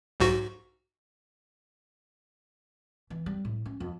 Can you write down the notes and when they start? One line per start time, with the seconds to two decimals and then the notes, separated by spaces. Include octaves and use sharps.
0.20 B1 G#2 F#4
3.10 E3
3.26 G3
3.45 A2
3.66 C#4
3.80 F2